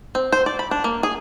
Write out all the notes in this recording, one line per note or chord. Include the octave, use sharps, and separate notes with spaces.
C4
C5
D5
B5
D4
A#3
G#4